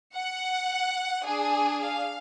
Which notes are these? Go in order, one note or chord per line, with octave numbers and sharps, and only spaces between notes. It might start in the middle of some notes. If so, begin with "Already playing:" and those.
F#5
D4 G#4
F5